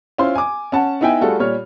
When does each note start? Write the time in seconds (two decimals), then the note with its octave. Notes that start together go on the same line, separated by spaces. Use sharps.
0.18 C#4 E4 F4 C5 C6
0.35 G#5 D6
0.72 C#4 F#5 A5
1.01 B3 D#4 E4 E5 G5 G#5
1.21 G3 A3 F4 F#4 G#4 A4
1.40 A#2 G3 C#5 F6